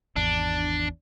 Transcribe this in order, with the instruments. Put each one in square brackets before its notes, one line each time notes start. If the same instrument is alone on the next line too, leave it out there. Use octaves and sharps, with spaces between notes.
[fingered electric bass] G#1 E2 [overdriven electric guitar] D4